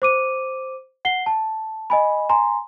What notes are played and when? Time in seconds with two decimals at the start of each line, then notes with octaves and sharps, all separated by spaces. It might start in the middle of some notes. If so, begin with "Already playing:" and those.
0.02 C5 D6 D#7
1.05 F#5 C7 G7
1.26 A5
1.90 D#5 G#5 B5
2.29 G#5 A#5 C6